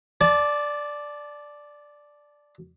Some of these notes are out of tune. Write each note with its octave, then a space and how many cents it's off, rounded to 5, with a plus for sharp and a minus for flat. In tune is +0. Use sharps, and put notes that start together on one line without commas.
D5 +0 A5 -25